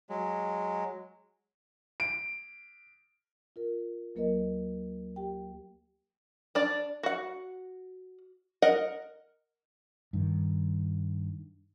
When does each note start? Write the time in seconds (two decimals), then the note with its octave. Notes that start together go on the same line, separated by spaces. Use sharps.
0.09 F#3 G#3
2.00 D7
3.56 F4 A#4
4.15 D2 F#3 A#3 A#4 B4 D#5
5.16 G4 G5
6.55 D4 D5
7.03 F#4 F#5
8.62 A#4 D#5 F#5
10.13 G2 D#3